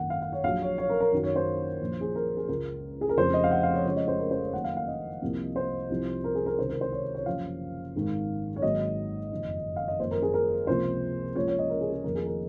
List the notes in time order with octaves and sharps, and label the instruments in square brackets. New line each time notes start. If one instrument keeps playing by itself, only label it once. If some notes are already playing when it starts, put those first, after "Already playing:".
Already playing: [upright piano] G#1 F#2 D#3 A#3 F#5
F5
F5
C#5
A#1 A#2 F#3 F5
C#5
C#5
A#4
A#4
F#2 D#3 F#3
C#5
C5
A#1 A#2 F3
G#4
A#4
G#4
C#2 C#3 G#3 A#4
G#4
A#4
F1 F2 C#3 F3 C5
D#5
F5
F#5
F5
C#5
F2 C#3 F3 G#3 C#5
D#5
C5
A#4
C5
C#5
F#1 F#2 D#3 F#3 A#3 F#5
F5
F5
D#5
C2 C3 F3 A#3
C5
C2 C3 F3
A#4
G#4
A#4
C#2 C3 D#3 C5
A#4
C5
C#5
C#5
F#1 F#2 C#3 F3 F5
G#1 G#2 D#3
C#5
G#1 G#2 F#3 A#3 D#5
F#1 F2 D#3
F5
D#5
G#1 F#2 F3 A#3 C5
A#4
G#4
A#4
C#2 C3 F3 A#3 C5
C#2 C#3 F3 A#3 C#5
C#5
D#5
A#4
G#4
G#4
F1 F2 D#3 A#3 A#4
G#4
A#4